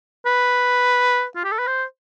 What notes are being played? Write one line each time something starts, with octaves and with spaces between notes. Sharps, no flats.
B4
F4
G4
A4
B4
C5